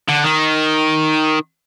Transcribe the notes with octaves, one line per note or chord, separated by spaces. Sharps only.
D3
D#3